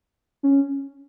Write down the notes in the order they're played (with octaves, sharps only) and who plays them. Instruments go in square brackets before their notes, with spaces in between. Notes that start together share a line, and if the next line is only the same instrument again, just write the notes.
[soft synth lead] C#4